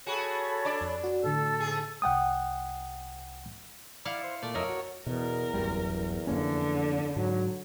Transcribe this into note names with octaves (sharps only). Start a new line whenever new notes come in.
F#4 G#4 A4 C#5 B5
D4 D5
F2
F#4
A2 D3 A4 E6
G#2 G#4
C2 F#5 G5 D#6
E4 D5 F5 F#5
C5
A#2 A3 D5
F2 A#4 C#5 D#5 E5
F#4
E2 B2 A#4
D1 F#2 G3
F2 D3 A#3 C#4
G#2 F#3